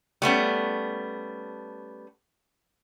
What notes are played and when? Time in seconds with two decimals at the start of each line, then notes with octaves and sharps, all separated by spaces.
0.22 G3 A3 B3 C#4